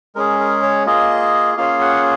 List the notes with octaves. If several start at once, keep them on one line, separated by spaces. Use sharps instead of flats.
G#3 C#4 G#4 A#4
A#4
C#5
A#3 F4 G#4 D#5
A#3 C#4 F4 G#4 F5
F#5